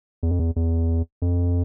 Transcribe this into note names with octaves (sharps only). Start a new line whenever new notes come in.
E2
F2
E2
E2
F2